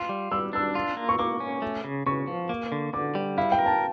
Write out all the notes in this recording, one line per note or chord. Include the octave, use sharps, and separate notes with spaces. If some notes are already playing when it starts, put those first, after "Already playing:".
Already playing: F4
G3
G3 E6
D4 E6
F4
A#3
C#6
A#3 D6
C#4
A3
C#3
C#3 C#6
F3
A#3
D3
D3 D6
G3
E4 F5
G5
A#4
A5